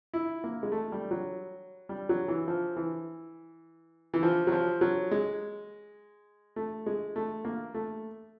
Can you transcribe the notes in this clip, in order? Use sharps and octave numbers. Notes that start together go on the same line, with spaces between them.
E4
A#3
G#3
A3
G3
F#3
G3
F#3
E3
F3
E3
E3
F3
F#3
F3
F#3
G#3
A3
G#3
A3
A#3
A3